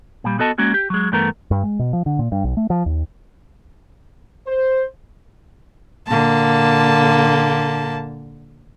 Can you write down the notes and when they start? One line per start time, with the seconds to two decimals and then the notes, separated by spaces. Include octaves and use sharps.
0.24 A#2 G3
0.39 B3 F#4 A4 D#5 A5
0.58 G#3 A#3 C#4 F#4
0.74 G4
0.90 F#3 G#3
1.12 G2 E3 A3 B3 A#4
1.51 G2
1.63 G#3
1.79 B2
1.93 F3
2.06 D3
2.19 A#2
2.32 G2
2.44 B1
2.57 A3
2.70 F3
2.86 D#2
4.46 C5
6.07 A#2 D3 A#3 A5